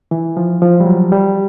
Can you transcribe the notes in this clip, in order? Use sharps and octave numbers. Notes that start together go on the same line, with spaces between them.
E3
F3
F3
G3
F#3
G3